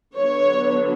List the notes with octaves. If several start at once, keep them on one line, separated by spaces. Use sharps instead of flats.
D3 F#3 B3 C#5